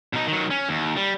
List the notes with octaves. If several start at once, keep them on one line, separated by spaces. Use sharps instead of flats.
B2 D#4
D#3 F#3
C#4
D#2
G3